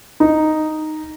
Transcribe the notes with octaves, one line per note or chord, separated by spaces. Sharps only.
D#4